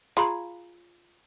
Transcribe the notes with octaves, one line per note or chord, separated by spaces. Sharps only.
F4 G#4 F5 A#5 B5